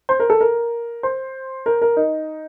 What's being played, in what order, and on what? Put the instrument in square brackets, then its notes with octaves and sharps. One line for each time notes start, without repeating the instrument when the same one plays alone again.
[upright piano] C5
A#4
A4
A#4
C5
A#4
A#4
D#4